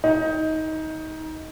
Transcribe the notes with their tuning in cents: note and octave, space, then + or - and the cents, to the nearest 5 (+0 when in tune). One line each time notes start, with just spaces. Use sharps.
D#4 +20